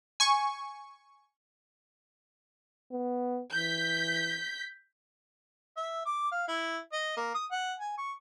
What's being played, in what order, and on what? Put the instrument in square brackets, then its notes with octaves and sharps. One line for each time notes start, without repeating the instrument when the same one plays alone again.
[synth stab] G#5 C#6
[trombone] B3
[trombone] E3 [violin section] G6 B6
[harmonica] E5
D6
F5
E4
D#5
A#3
D#6
F#5
G#5
C#6